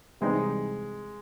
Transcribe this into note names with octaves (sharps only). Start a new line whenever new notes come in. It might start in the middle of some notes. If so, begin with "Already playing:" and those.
C3 E3 G3 G#3 C4 D#4